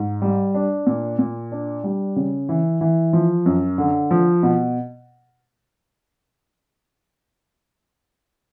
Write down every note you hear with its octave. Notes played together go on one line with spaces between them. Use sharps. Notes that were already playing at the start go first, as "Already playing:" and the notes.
Already playing: G#2
G3
D4
A#2
A#2
D4
G3
C#3
E3
E3
F3
F#2
D3
F3
B2